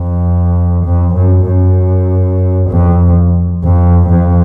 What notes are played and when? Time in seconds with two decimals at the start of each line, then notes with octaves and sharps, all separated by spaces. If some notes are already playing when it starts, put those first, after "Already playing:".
Already playing: F2
0.85 F2
1.16 F#2
1.47 F#2
2.70 F2
3.64 F2
4.10 F2